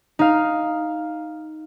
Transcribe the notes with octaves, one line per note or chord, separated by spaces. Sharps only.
D#4 F5